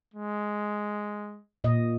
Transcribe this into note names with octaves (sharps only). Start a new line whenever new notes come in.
G#3
A#2 D#5